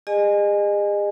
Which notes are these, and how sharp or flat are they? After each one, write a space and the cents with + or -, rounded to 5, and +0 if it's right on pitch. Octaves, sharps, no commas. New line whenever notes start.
G#4 -40 D#5 -30 G#5 +0